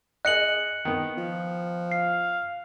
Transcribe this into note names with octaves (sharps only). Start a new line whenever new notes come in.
G#4 D#5 F#6 C#7 F#7
D#3 B3
F3
F5 C7